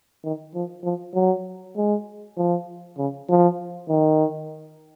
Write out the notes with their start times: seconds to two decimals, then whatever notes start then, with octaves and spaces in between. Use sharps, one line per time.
0.23 D#3
0.54 F3
0.84 F3
1.14 F#3
1.76 G#3
2.37 F3
2.97 C#3
3.29 F3
3.89 D#3